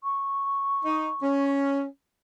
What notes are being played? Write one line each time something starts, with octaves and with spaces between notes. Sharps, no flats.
C#6
D#4
C#4